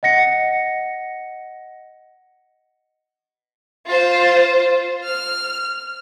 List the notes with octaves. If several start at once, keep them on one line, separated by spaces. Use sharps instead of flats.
D#5 F#5 A#6 C#7
F4 C5
F6